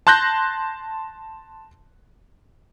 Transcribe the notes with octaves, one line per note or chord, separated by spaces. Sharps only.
A5 C6 F#6 G6 A#6